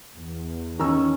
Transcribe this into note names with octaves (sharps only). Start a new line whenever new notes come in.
E2
D#3 C#4 A#5 E6